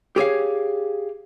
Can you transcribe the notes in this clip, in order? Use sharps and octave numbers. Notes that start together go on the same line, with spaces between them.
G4 G#4 C#5 F5